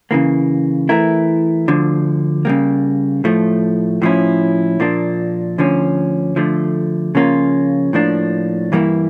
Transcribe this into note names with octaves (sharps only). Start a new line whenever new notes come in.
C#3 E3 A#3
E3 A3 E4 A#4
D2 D3 F3
C#3 G3 A#3
A2 F3 A3
A2 F3 C#4 E4
A#2 F3 A#3 D4
D2 D3 F3 C#4
D3 F3 A3
C#3 F3 A#3 C#4 F4
A2 F3 A#3 D4
G2 E3 G3 A#3 E4